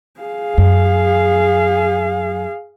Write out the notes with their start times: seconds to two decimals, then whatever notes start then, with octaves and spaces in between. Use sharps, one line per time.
0.20 G#4 F5
0.58 F#2